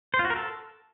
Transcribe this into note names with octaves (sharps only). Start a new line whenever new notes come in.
C5
F4
F#4
A#4
A4